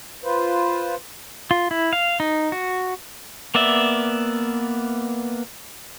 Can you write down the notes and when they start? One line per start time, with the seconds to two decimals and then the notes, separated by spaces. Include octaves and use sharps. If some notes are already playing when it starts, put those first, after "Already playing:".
0.24 F4 B4 C5
1.51 F4
1.71 E4
1.93 F5
2.20 D#4
2.52 F#4
3.55 A#3 B3 D5 E5